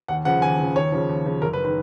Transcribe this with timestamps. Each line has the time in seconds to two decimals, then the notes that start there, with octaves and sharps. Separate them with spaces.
0.08 D#2 F#5
0.25 C#3 F3 F#5
0.42 D#2 G#5
0.59 C#3 F3
0.76 D#2 C#5
0.92 C#3 F3
1.09 D#2
1.25 C#3 F3
1.42 F#1 A#4
1.53 B4
1.64 D#3 B4